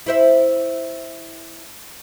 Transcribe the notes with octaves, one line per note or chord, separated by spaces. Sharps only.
E4 C5 E5